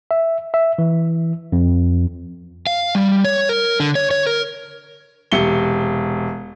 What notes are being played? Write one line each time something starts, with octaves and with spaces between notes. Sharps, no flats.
E5
E5
E3
F2
F5
G3
C#5
A#4
D3
C#5
C#5
A#4
E1 C3 C#7 G7